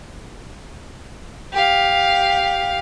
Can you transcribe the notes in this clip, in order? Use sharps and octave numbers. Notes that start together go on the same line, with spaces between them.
G4 F5